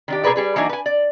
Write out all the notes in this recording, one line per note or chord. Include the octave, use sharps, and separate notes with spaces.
D#3 D4 G4
B2 G#4 A#4 B4 D5
G3 G#4 B4
E3 F#3 A#3 D4 D#4 F#4
B4 G#5
D5